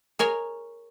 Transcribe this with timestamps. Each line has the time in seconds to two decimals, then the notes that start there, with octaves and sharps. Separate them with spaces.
0.19 G#4 A#4 C#5 G#5